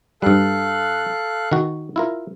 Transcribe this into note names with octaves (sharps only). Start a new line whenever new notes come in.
G2 G3 A4 F5 F#6
D#3 F#4
E4 F4 A#4